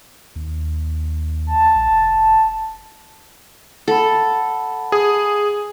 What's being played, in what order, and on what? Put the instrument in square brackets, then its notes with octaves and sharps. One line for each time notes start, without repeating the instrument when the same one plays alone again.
[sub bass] D#2
[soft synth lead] A5
[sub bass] A#1
F1
[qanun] A4 [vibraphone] F#5 A5 B5
[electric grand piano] G#4